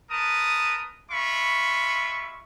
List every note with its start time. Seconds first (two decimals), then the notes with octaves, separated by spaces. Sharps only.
0.11 A#4 B4 A5 D#6
1.10 G#3 F4 E5 B5 C#6